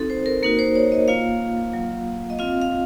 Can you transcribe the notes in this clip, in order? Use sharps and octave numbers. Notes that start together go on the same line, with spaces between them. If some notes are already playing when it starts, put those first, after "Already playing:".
Already playing: C4 D#4 F#4 A4
C5
A#4
A#3 D#4 F#4 A#4
C5
C#5
D#5
A#3 F4 F5
F#3 A#3 F4
D#5
C4 F4 F5
F5